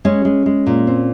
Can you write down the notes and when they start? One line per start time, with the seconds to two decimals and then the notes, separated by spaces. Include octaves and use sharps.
0.05 G#3 C#4
0.25 G#3
0.46 G#3
0.67 A#2
0.87 C4